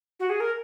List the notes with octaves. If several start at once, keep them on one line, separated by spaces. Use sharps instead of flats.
F#4
G#4
A#4